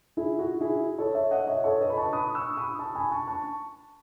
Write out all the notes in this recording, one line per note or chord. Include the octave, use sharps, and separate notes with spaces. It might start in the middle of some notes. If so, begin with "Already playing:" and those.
E4 G#4
F#4
E4 G#4
A4 C#5
C#5 E5
D#5 F#5
C#5 E5
A4 C#5
B4 D#5
B5
A5 C#6
B5 D#6
C#6 E6
B5 D#6
A5 C#6
G#5 B5
A5 C#6
A5 C#6